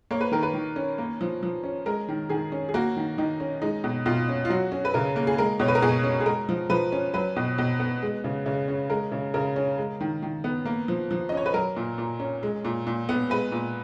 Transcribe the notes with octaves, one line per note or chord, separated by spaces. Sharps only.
A#3 C#5
B4
D#3 A#4
B4
D#3
C#4
A#3
F3
F3
C#4
G#3 A#4
D#3
D#3 G#4
C#4
G#4
A#3 F#4
D#3
D#3 D#4
C#4
G#3 D#4
B2
B2 F4
C#4
F4
F#3 F#4
C#4
B4
C#3 A#4
A#3
G#4
G#3 A#4
B2 C#5
B4
A#4
B2 G#4
C#4
G#4
G#3 A#4
F3
F3 B4
C#4
F#3 B4
B2
B2
B3
G#3
C#3
C#3
C#4
G#3 A#4
C#3
C#3 A#4
C#4
G#3
D#3
D#3
B3
A#3
F3
F3
C#4 D#5
C#5
B4
F#3 A#4
A#2
A#2
C#4
G#3
A#2
A#2
B3
G#3 B4
A#2